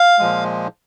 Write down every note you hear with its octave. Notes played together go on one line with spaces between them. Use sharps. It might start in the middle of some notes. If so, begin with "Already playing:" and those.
Already playing: F5
A#2 F3 G#3